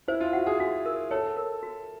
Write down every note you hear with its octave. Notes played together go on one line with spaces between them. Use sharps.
E4 C5
F4
F#4 F#5
G#4
F#4 G#4
A#4
A4 C#5
A#4
F#4